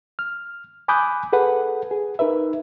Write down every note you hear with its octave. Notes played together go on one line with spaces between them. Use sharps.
F6
G#5 B5 D6 D#6 F#6 G6
G#4 A4 B4 F#5
G#4
D#4 A#4 B4 E5